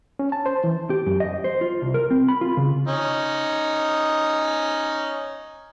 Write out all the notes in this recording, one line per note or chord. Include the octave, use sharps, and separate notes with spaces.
C#4
A5
C5
E3
G4
F#2
D#5
C5
F4
C2
A#4
C4
B5
F4
C#3
C#4 D#4